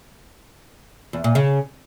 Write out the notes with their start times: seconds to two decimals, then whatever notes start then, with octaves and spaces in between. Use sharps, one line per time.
1.13 E2
1.24 A#2
1.35 C#3